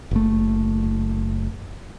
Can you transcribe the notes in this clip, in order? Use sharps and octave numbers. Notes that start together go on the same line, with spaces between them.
F#1 A3